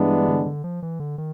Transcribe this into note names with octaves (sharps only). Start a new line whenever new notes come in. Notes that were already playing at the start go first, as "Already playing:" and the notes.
Already playing: G2 E3 G#3 B3 D4
D3
D3
F3
E3
D3
D#3